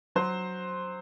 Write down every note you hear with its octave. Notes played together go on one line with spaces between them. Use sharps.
F#3 C5